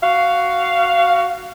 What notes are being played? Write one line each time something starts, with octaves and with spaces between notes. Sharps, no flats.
F#4 F5